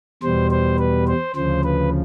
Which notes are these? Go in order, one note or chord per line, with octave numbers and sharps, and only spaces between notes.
E2 B2 G3 C5
C5
B4
C5
D2 C#3 F3 C5
B4